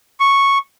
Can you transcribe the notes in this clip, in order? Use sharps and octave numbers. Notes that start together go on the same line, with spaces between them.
C#6